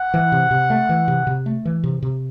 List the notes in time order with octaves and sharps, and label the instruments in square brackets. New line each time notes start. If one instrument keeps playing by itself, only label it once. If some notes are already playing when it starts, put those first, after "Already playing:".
Already playing: [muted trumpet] F#5
[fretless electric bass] E3
C3
C3
A3
E3
C3
C3
A3
E3
C3
C3